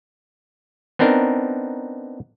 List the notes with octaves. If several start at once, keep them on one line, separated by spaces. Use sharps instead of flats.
B3 C4 D4 D#4 A#4